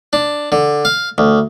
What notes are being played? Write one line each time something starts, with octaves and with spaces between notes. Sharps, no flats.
D4
D3
F5
D2